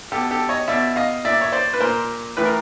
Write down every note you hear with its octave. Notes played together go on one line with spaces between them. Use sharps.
B2 G4 A4
G4 A4
C#5 D#5
B2 D5 E5
D#5 F5
A#2 D5 E5
C#5
C5 D5
B4
A#2 A#4 C5
A2 E3 B4
A#4